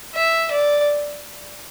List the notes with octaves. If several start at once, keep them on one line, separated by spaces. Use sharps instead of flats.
E5
D5